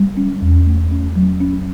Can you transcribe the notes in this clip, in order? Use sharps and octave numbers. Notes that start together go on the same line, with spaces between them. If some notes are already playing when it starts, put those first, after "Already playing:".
Already playing: G3
C#4
E2
A3
C#4
F#3
C#4